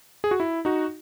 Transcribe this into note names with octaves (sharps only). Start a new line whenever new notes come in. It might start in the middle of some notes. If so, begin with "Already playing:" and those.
G#4
F#4
E4
D#4 F#4